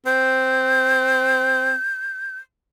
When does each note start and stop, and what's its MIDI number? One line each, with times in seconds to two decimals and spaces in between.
0.06 1.74 60
0.06 2.38 91